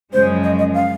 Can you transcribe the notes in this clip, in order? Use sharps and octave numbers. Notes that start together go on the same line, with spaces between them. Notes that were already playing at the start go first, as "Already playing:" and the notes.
F#2 C#3 F3 G#3 C5
D#5
D#5
F5